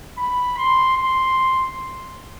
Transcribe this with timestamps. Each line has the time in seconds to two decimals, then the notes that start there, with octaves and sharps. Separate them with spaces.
0.18 B5
0.57 C6
0.96 C6